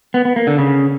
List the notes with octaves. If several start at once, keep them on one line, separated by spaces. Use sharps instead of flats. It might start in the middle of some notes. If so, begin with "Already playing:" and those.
B3
B3
A#3
D3
C#3